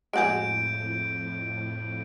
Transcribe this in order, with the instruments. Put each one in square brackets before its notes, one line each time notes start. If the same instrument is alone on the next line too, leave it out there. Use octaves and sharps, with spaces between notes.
[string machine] F2 A2 [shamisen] G#3 F#4 G#4 [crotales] G6 D7